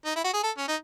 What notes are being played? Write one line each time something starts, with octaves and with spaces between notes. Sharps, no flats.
D#4
E4
F#4
G#4
A4
C#4
D#4